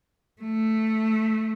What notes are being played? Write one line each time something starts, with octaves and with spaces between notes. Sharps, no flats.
A3